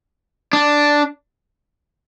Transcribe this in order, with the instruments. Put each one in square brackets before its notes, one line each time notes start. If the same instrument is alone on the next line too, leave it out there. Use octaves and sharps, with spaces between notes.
[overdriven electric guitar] D4